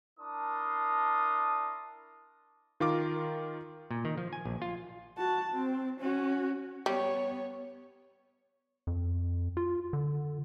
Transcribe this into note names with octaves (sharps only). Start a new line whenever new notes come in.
D4 E4 A#4 A5 C6 D#6
D#3 F4 A#4 D6
A#2
D#3
F3
G#5
A#1
F4
F#4 A5
C4
C#4 F#4
G3 B3 C#5
F2
F4
D3